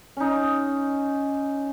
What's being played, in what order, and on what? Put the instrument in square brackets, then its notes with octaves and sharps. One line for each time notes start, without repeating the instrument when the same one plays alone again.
[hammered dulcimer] C#4 D#4